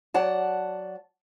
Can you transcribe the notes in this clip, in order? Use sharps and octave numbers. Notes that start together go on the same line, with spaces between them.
F#3 D5 F#5 A5